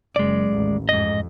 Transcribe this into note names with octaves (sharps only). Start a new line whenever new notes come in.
F#1 G#3 D5
A1 D#2
F2 G#2 D#5